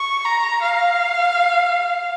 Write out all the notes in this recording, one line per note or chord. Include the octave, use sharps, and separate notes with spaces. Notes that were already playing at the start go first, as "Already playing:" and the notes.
Already playing: C#6
A#5
F5